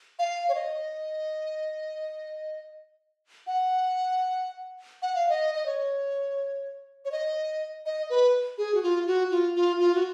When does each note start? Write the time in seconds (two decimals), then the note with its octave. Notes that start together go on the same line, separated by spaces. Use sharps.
0.19 F5
0.49 C#5
0.55 D#5
3.47 F#5
5.02 F#5
5.15 F5
5.29 D#5
5.55 D#5
5.66 C#5
7.05 C#5
7.12 D#5
7.86 D#5
8.10 B4
8.58 G#4
8.74 F#4
8.83 F4
9.07 F#4
9.31 F4
9.55 F4
9.80 F4
9.95 F#4